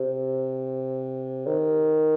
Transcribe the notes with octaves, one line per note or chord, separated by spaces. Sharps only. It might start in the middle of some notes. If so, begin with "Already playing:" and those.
Already playing: C3
D#3